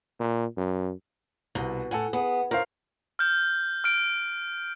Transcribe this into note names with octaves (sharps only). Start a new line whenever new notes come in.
A#2
F#2
C2 B2
A2 A4 F#5 G#5
B3 G#4
A2 A#4 C5 F5
F6 G6
F6 D7